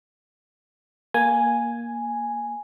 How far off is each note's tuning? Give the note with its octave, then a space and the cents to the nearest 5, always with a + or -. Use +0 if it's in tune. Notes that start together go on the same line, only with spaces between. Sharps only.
A#3 +10 G#5 +0